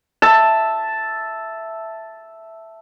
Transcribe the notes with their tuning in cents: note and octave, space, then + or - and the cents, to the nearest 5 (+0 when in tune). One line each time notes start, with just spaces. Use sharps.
E5 +0 A5 +0